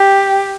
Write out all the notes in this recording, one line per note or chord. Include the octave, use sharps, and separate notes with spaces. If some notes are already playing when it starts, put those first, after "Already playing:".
Already playing: G4